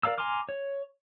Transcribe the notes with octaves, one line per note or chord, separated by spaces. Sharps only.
A#4 D5 F5 A#5 E6
G#5 A#5 C6 D6 F6
C#5